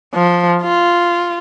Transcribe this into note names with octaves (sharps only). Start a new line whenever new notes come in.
F3
F4